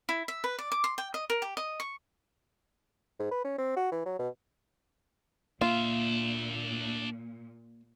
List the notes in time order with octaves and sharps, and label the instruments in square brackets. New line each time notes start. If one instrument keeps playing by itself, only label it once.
[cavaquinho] E4
E5
B4
D5
D6
C6
G5
D#5
A#4
G4
D#5
C#6
[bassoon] G#2
B4
C#4
C4
F#4
E3
F#3
B2
[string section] A#2 [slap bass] A#3 [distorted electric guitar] D4 E5 [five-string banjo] F4